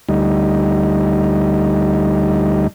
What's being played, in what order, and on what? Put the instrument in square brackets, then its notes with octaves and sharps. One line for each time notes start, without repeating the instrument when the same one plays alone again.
[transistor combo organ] D2 G3 D#4